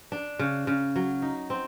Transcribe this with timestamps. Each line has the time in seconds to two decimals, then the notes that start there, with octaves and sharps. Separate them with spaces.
0.12 D4
0.39 C#3
0.67 C#3
0.96 F#3
1.22 D#4
1.50 C4